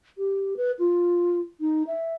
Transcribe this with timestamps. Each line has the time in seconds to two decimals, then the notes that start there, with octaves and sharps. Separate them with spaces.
0.18 G4
0.57 B4
0.79 F4
1.61 D#4
1.87 E5